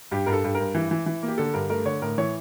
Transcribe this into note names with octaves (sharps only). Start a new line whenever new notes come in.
G2 G4
G2 A#4
A4
G2
A#4
G2
E3
E3
E3
A#3
G4
D3 A4
G2 A#4
A3 A#4
D3 C#5
A2 A#4
E3 C#5